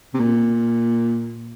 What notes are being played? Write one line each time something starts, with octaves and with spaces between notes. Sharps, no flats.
C3
A#2